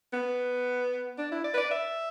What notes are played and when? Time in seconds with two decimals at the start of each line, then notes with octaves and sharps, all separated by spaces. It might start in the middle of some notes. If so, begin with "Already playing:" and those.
0.13 B3
1.18 D4
1.32 E4
1.44 D5
1.54 B4
1.58 D5
1.71 E5